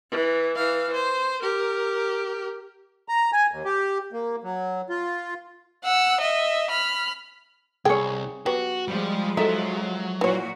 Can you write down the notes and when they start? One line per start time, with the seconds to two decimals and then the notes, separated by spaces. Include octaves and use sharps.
0.11 E3
0.56 E3 F5
0.93 C5
1.42 G4 A#4
3.09 A#5
3.33 G#5
3.52 D#2
3.65 G4
4.13 A#3
4.44 F#3
4.89 F4
5.84 F#5 E6
6.21 D#5 E5
6.70 B5 F6
7.85 C2 G#4 C#5 G5
8.46 F#3 B3 F#4 G4
8.88 F3 G3 G#3
9.37 F#3 D#4 A4 E5
10.21 A#2 E3 F#4 C#5